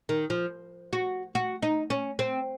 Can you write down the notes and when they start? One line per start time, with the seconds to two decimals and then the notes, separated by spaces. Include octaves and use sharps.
0.09 D#3
0.30 F3
0.93 F#4
1.35 F#4
1.62 D#4
1.90 C#4
2.19 C4